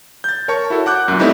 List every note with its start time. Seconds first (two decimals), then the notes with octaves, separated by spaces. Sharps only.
0.24 G6 A6
0.48 A#4 C#5 A5 C#6
0.70 E4 F#4 A4
0.86 F#5 D6 F#6 G6
1.08 F#2 A#2
1.19 G3 A3 B3 C4 D#4 E4